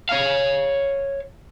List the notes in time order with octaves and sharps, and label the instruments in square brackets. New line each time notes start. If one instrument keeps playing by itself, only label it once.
[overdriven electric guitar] C#5 F5